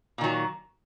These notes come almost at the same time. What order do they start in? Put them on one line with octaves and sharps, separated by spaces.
A#2 D#3 F#3